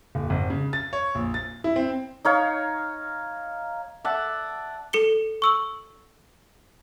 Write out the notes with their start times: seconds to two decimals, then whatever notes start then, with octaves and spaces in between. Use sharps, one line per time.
0.15 D#1
0.30 G#1
0.50 C#3
0.73 A6
0.93 C#5
1.15 A#1
1.34 A6
1.64 E4
1.76 C4
2.25 D#4 C#5 F5
4.05 D5 E5 F#5 A5
4.93 A4 C#7 G7
5.42 C#6 E6 F#7